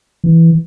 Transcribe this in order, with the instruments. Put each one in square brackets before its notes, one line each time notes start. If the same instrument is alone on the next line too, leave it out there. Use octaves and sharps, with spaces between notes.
[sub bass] E3